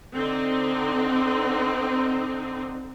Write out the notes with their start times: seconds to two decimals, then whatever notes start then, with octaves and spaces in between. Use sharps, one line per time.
0.15 D3 C4 D#4